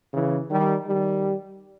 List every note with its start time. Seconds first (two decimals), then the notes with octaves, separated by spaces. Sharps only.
0.13 C#3 E3
0.50 D#3 G3
0.86 D#3 G3